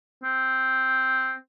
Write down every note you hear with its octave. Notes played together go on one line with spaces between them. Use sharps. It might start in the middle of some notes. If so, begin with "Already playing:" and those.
C4